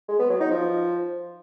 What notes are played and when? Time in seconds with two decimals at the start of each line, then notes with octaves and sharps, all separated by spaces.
0.09 G#3
0.19 B3
0.30 F#3
0.40 D#4
0.51 F3